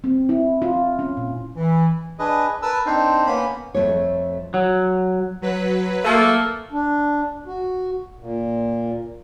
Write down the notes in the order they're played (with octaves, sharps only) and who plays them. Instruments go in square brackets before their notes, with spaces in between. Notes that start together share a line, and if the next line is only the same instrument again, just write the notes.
[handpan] C4
E4
F4
C#4
A#2
[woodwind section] E3
[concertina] D4 G#4 B4 D#5
A#4 B4 A5 E6
C4 D4 D#4 C5
A#3 B3 C#4 B5
[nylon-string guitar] F2 A#2 A3 C#5
[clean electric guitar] F#3
[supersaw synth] F#3 B4
[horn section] A3 A#3 A4
[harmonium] D4
F#4
A#2